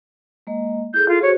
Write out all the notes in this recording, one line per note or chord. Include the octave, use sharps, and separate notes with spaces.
G#3 A#3 D#5
E4 G#4 A4 G6
F4
F#4 G#4 C5 C#5